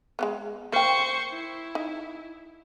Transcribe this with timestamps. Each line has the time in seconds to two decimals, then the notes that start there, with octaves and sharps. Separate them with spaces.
0.19 G#3 A3 B3
0.72 A#3 C5 G5 C#6
1.32 E4
1.75 D#4